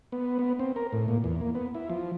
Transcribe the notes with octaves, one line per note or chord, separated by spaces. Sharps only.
B3
B3
C4
A#4
A2
A#2
E2
A#3
B3
E4
F3